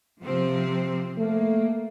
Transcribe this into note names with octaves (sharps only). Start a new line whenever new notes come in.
C3 F3 C4
A3 A#3